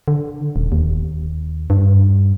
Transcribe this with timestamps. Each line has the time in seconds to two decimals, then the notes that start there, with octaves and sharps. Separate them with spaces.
0.08 D3
0.56 D#1
0.72 D#2
1.70 G2